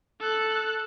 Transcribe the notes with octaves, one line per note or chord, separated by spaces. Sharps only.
A4 F#6